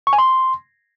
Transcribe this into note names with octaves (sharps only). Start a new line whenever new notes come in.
C#6
G#5
C6